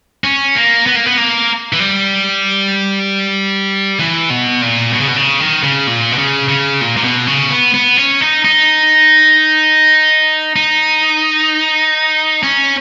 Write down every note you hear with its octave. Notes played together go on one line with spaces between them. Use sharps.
C#4
A#3
B3
A#3
B3
A#3
E3
G3
E3
B2
A#2
B2
C#3
B2
C#3
D#3
C#3
A#2
B2
C#3
C#3
A#2
A#2
B2
C#3
B3
B3
C#4
D#4
D#4
D#4
C#4